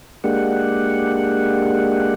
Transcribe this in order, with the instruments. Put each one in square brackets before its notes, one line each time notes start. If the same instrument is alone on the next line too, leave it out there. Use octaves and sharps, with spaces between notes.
[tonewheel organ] G#3 A#3 D4 G4 F#5